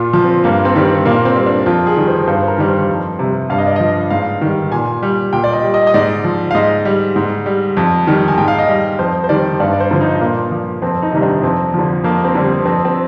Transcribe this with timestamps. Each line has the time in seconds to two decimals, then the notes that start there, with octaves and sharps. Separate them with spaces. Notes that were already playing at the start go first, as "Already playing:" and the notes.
Already playing: A#2 F4
0.14 F3
0.24 C4
0.44 G2 A#3
0.65 C4
0.75 D#3 G3
0.85 C4
1.05 A#2 A#3
1.25 C4
1.35 G3
1.46 D4
1.66 F2 F4
1.87 G#4
1.97 D#3 G3
2.08 C5
2.27 G2 C5
2.48 A#4
2.58 D#3 G3
2.68 C5
2.89 F2
3.19 C3 G3
3.50 G2 F5
3.58 D#5
3.67 D5
3.76 F3 D#5
4.10 G#2 F5
4.41 D#3 G3
4.72 A#2 G#5
5.03 G3
5.33 A#2 G5
5.44 D5
5.53 D#5
5.63 G3
5.74 D#5
5.87 D#5
5.94 G#2 D5
6.24 F3
6.51 F5
6.55 G#2 D#5
6.85 G3
7.16 G#2
7.46 G3
7.77 F2
8.07 D#3 G3
8.28 G#5
8.38 G#2 G5
8.48 F5
8.58 D#5
8.69 G3
8.99 F2 C5
9.24 C5
9.29 D#3 G3 D5
9.60 G2 D5
9.73 D5
9.80 C5
9.91 D3 F3
10.01 D#4
10.21 A#2 A#3
10.52 F3
10.82 F2 C4
11.02 D#4
11.13 C3 D#3 G3
11.22 D4
11.43 F2 C4
11.74 D3 F3
12.04 F2 A#3
12.24 C4
12.35 D3 G3
12.44 C4
12.65 F2 C4
12.85 C4